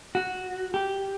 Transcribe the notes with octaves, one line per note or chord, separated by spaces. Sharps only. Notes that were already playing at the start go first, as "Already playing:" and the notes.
F#4
G4